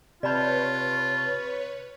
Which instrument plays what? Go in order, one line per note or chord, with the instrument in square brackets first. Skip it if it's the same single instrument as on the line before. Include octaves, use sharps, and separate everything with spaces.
[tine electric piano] C3 A5 G6 [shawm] F4 [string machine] B4 C#5 [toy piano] D5 B5